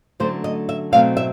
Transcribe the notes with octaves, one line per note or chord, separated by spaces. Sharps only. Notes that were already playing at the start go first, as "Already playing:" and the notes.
D3 F#3 A3 C#4 C5
D#5
E5
B2 F#3 A3 C4 F5
E5